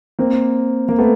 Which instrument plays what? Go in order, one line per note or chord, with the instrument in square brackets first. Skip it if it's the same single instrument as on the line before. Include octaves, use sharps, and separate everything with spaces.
[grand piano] A#3 C4
A#3
A3 B3